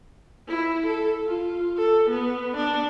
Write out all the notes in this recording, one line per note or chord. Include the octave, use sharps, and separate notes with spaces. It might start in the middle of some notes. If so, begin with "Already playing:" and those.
E4
A4
F4
A4
B3
D4